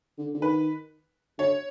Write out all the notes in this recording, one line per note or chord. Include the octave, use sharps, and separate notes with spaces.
D3
D3
D#3 B4
D3 C#5